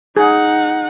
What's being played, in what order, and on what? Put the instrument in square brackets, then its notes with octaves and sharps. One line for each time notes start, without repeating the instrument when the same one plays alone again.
[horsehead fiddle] D#4 F#5 [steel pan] G#4